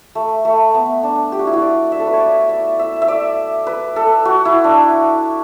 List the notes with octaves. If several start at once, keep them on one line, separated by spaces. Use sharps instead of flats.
A3
A3
B3
D4
G4
F#4
E4
F#4
D5
E5
A4
B4
C#5
D5
E5
E5
E5
D5
B4
A4
F#4
E4
D4